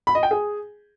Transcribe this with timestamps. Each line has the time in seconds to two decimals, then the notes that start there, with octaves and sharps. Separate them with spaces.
0.07 B5
0.15 D#5
0.23 G5
0.31 G#4